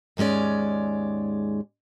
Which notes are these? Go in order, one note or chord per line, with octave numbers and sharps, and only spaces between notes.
D#2 G#2 G#3 C#4 D5